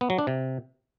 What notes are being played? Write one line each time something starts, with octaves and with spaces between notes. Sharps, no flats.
B3
F#3
D4
C3